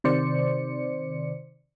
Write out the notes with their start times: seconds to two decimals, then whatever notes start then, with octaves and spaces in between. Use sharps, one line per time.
0.04 C3 D#3 C5 D5 C#7